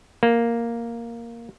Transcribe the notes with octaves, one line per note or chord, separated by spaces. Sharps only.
A#3